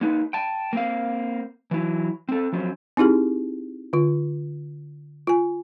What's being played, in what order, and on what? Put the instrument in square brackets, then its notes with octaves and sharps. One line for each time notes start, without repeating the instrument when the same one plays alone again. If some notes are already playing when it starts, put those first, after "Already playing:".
[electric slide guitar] A#3 D#4 B4
G5 A5
A#3 C4 F5
E3 F#3 E4
C4 A4
F3 F#3 C4 C#4
[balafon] C4 D#4 E4 G4 G#4
D3 F4
F4 G#5